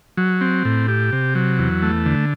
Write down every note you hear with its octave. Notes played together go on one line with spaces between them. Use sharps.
F#3
C4
A2
G4
C3
F#3
E2
A3
D3